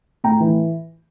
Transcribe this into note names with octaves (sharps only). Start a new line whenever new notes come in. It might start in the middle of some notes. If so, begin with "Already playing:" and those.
A2 G5 A#5
E3